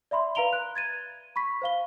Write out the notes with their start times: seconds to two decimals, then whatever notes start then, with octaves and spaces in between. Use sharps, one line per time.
0.11 D5 E5 B5 C6
0.35 B4 F5 A#5 D7 F7 G7
0.53 F#6
0.75 G#6 A6 D#7
1.36 B5 C#6 B6
1.62 C5 F5 G7